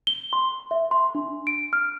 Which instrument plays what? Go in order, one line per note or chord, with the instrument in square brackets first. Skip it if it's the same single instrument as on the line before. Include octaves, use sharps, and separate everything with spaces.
[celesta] G7
C6
E5
C6
D4
D7
F6